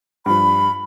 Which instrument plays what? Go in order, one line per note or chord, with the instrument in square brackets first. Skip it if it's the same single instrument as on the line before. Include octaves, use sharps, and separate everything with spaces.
[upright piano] G2 F3 [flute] B5